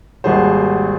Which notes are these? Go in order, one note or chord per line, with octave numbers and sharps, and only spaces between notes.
G#1 D#2 G3 F#4 G#4 C5